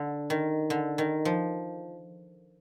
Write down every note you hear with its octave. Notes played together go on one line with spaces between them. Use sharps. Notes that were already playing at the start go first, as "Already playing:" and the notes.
Already playing: D3
D#3
D3
D#3
F3